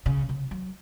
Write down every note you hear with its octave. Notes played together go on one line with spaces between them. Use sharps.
C#3
C#3
F#3